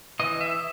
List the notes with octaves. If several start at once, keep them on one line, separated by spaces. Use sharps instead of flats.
E3 D#5
E5